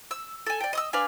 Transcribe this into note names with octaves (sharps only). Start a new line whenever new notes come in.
E6
A4 G#5
D5 G5
D#5 D#6 E6
D4 B4 F5 G#5